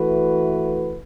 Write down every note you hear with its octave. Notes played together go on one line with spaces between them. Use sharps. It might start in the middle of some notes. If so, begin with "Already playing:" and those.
Already playing: E3 A3 F#4 B4